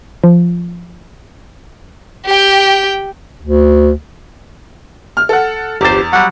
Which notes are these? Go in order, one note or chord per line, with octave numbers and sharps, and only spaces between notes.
F3
G4 G5
D2
F6
A4 F#5
G1 E2 G4 C5 A6
F#3 G3 F#5